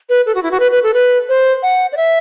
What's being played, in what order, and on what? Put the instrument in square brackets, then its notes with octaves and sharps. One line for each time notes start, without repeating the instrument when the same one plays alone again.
[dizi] B4
A4
F#4
E4
F#4
B4
B4
A4
B4
C5
F#5
D5
E5